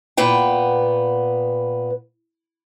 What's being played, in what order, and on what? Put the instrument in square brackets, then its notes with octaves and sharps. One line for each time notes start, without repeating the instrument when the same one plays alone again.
[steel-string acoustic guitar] A#2 B3 B4 G5